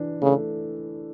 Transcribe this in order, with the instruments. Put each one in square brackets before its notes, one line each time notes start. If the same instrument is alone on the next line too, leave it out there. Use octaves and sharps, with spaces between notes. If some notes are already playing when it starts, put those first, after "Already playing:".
Already playing: [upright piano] E3 D4
[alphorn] C#3 [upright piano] A3